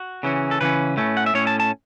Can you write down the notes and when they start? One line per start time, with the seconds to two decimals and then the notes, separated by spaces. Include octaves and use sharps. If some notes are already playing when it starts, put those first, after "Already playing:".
Already playing: F#4
0.23 C#3 E3 C#4
0.51 A4
0.61 C#3 E3 C#4 B4
0.97 A2 A3 C#4
1.17 F#5
1.26 E5
1.34 A2 A3 C#4 C#5
1.47 A5
1.60 A5